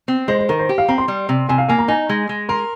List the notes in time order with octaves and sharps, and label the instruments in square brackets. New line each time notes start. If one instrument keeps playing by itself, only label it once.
[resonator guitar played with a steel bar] C4
[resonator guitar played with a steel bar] G#3 [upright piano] C5
[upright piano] C5
[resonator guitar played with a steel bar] D#3 [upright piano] A#4
[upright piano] C5
[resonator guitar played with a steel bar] G4
[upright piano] F5
[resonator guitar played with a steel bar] C4 [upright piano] A#5
[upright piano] C6
[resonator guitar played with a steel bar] G3
C3
[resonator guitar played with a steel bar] C3 [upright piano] G#5
[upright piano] F5
[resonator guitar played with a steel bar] A#3 [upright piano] G#5
[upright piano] A#5
[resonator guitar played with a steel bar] D#4 [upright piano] G#5
[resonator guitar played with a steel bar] G#3
G#3
[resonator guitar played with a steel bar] A#4 [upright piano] C6